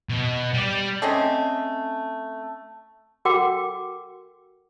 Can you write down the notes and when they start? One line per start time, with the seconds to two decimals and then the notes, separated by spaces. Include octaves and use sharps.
0.09 B2
0.54 G3 D5
1.02 A3 C4 C#4 D#5
3.25 F#4 A4 A#4 F#5 G5 D6